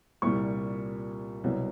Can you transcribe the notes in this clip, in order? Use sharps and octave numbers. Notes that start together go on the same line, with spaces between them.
C2 A#2 G3 C#6
C2 B2 F#3